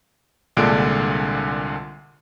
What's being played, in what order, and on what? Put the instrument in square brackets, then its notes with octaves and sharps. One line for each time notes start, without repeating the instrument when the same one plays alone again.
[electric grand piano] C2 A#2 D3 G#3 D4 D7